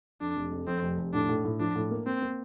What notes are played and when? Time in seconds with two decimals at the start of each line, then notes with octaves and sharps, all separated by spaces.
0.21 F2 D4
0.36 F1
0.51 F2
0.67 F2 C4
0.83 F1
0.98 F1
1.14 A2 D4
1.29 A2
1.45 A2
1.60 F3 D4
1.75 A2
1.91 A#3
2.06 A#3 C4
2.22 A#3